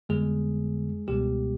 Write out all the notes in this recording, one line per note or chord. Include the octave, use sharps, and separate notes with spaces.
G1 F2 D3 G3 G#3 B3 G#4
C#2 B2 G3 G#3 B3 G4